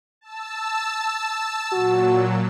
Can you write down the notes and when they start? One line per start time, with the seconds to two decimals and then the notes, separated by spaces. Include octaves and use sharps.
0.21 A5 E6
1.73 A#2 F#3 F#4